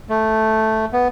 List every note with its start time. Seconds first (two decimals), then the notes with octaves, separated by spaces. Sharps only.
0.09 A3
0.93 B3